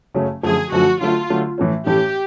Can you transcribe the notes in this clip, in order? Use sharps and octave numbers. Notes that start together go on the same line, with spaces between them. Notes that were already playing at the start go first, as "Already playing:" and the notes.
F#2 C#3 F#3 A3 C#4
F#2 D3 F3 A3 G#4
F#2 D3 F3 A3 F#4
D3 F#3 A3 F4
D3 F#3 A3
A2 E3 A3 C#4
A2 E3 A3 C#4 G4